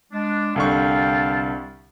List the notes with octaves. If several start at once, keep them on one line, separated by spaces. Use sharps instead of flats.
G#3 D4
C2 D3 F5 G5 A5 C#6